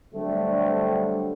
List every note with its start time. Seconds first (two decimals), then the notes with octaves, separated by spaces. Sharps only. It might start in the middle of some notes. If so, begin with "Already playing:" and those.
0.14 D3 F#3 G3 A3 C4 D4